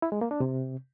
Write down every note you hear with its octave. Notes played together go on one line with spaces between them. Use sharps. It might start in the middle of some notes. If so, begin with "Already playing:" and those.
E4
G#3
A#3
D4
C3